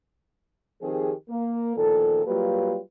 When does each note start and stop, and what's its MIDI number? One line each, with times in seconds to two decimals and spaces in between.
0.82 1.11 51
0.82 1.11 53
0.82 1.11 60
0.82 1.11 67
0.82 1.11 68
1.29 1.73 58
1.77 2.23 40
1.77 2.23 46
1.77 2.23 51
1.77 2.23 53
1.77 2.23 69
2.26 2.78 54
2.26 2.78 55
2.26 2.78 58
2.26 2.78 65
2.26 2.78 67
2.26 2.78 71